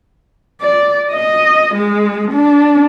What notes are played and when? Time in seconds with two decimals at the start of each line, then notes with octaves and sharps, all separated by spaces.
0.62 D5
1.12 D#5
1.75 G#3
2.31 D4